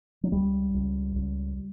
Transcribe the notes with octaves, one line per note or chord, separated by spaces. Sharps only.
F#3
C#2 G3
C#2
C#2